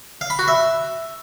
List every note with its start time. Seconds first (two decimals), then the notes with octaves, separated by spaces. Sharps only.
0.21 F5
0.30 B5
0.39 F#4
0.48 E5